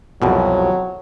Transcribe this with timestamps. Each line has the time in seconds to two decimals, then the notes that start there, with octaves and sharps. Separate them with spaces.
0.22 C2 F2 B2 F#3